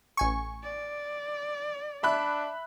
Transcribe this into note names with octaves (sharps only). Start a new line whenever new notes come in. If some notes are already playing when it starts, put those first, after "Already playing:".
A1 G#5 C#6
D5
D4 E5 B5 F#6